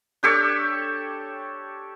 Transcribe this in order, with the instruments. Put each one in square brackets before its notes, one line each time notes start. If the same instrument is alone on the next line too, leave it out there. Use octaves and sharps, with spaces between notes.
[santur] D4 G4 A4 C#5